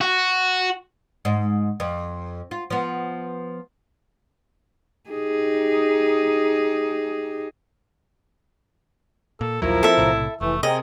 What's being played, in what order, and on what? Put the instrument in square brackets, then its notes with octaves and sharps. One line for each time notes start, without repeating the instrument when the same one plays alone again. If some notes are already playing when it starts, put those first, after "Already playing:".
[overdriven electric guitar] F#4
[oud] G#2
F2
F4
F3 B3
[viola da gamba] D#4 G4 G#4
[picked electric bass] A#2 [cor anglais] A4
[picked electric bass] A#1 D#2 F#3 [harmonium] F3 A#4 [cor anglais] E4
[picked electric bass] C4 [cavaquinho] A4 E5
[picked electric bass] B1 A2 C3
[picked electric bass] F1 [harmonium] E3 [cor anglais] A3
[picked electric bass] C3 [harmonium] C4 A#4 [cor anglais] G#4 [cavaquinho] D#5